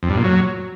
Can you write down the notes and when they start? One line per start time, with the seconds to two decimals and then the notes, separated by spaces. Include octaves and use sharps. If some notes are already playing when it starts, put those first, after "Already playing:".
0.03 F2
0.10 G2
0.17 A#2
0.24 F#3